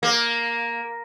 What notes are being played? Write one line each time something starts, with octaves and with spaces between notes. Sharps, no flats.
A#3